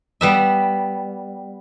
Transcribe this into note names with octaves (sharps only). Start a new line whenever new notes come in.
G3 B3 E5